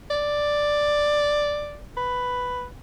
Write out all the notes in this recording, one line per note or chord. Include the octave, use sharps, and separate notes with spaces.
D5
B4